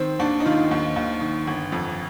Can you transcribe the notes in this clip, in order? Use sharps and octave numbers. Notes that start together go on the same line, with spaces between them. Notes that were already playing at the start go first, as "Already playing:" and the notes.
Already playing: D#3 C4
D#2 D4
D#4
D#3 F4
D#2
D#2
D#3
G1
F2